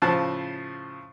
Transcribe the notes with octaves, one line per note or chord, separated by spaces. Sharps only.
A2 C#3 F3 A5 F#6